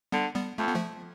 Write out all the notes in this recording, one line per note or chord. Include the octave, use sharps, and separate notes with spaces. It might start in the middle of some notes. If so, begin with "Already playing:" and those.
D3 G3 B3
G3 B3
F2 A3
B3
F3 A3